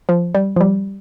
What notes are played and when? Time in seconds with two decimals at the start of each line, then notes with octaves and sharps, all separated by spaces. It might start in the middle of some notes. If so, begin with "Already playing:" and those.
0.09 F3
0.35 G3
0.56 F3
0.61 G3